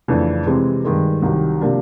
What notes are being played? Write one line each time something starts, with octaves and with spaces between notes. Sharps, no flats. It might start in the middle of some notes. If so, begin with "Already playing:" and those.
F2 C#3 E3 A3 D4
C3 E3 G#3 C4
G2 D#3 G#3
C2 C3 D#3 F#3
C3 F3 A#3 D4